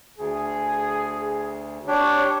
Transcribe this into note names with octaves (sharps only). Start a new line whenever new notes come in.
D2 G#4
D4 G4 C#5